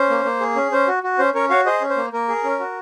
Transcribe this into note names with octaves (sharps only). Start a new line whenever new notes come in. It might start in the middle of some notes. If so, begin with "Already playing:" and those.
Already playing: C#4 C5
A#3
A#3
G#4
C#4
C#4 C5
F#4
F#4
C#4 C5
C#4 A#4 C#5
F#4 C#5 F5
G#4 C5 D#5
C#4
C5
A#3
A#3 A#4
G#4
C#4
F#4